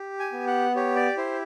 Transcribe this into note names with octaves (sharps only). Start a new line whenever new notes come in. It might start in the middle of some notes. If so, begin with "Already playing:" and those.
Already playing: G4
G#5
B3
F#5
G4 C#5
D5
E4 C5